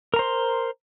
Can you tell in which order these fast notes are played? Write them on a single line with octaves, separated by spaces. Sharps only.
A#4 A#5 C5 C6